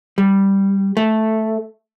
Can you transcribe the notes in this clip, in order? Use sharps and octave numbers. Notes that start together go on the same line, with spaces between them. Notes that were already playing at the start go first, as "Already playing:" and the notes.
G3
A3